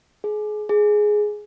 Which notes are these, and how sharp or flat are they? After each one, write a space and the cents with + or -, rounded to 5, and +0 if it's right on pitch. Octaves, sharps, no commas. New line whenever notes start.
G#4 +30
G#4 +5